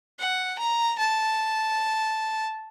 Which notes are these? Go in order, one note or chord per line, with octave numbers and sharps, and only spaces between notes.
F#5
A#5
A5